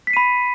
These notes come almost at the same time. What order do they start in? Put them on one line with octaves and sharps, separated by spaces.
B6 C7 D#7 B5